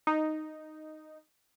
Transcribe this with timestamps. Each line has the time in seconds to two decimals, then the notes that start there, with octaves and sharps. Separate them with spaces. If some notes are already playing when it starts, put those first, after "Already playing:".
0.07 D#4